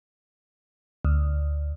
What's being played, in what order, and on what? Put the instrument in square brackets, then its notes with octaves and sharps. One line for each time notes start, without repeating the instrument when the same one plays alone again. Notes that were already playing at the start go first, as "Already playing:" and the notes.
[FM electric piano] D2